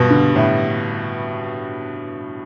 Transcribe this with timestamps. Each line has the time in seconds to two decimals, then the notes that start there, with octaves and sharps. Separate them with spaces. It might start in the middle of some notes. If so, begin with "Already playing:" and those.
Already playing: G2 B2
0.10 D3
0.36 A2